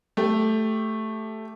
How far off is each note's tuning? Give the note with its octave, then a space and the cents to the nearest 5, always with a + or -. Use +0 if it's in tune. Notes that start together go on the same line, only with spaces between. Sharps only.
A3 +0 G4 +5